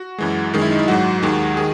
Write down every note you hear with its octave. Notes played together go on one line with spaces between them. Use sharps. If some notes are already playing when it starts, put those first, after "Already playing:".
Already playing: F#4
F#2 E3 G#3
F#2 D#3 G#3
E4
D#4
E4
G#2 F#3 F#4
D#2 D#3 G#3
D#3 G#4